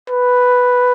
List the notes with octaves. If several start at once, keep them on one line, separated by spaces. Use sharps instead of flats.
B4